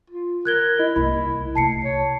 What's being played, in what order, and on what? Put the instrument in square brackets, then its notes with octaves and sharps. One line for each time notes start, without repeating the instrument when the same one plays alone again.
[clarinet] F4
[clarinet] A#4 [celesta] F#6 G#6 G7
[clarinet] E4 [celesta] D#5
[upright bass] C2 A#3 [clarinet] E4 [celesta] B5
[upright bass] C3 A3 [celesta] A5 C7 C#7
[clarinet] C#5